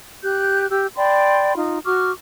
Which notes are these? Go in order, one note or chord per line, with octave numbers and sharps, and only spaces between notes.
G4 F#6 G6
G4 E6
D5 G5 B5 C6
D#4 F4
F#4 C#6 D6 F6